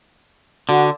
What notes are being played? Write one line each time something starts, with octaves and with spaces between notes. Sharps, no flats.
D3 F#4